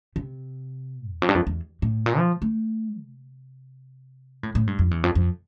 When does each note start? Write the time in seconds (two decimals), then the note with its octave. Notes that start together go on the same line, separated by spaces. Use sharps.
0.16 C3
1.10 E2
1.22 F2
1.29 G2
1.35 F2
1.47 E2
1.82 A2
2.06 A#2
2.18 F3
2.42 A3
3.01 C3
4.43 A2
4.55 A2
4.67 G2
4.79 F2
4.91 E2
5.03 F2
5.15 F2